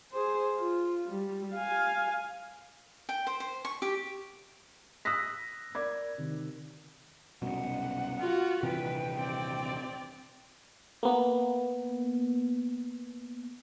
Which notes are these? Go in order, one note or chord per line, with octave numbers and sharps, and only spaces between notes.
G#4 C5
F4
G3
F5 G#5
G5
C5
C5
C#6
G4
D#6 E6 F#6 A#6 B6
A#4 D5 D6 G#6
C3 D#3
C2 F#2 B2 F#5
F4 F#4
D#1 C3 E3 B4 G5
C4 D5
A#3 B3